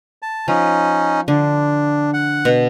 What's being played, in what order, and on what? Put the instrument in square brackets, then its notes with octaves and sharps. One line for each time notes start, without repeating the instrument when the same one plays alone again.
[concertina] A5
[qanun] F3 [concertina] C#4 D#4
[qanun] D3 [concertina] D4
[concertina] F#5
[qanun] B2